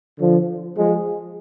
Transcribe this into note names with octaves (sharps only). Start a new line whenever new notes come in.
D3 F3
F3 G#3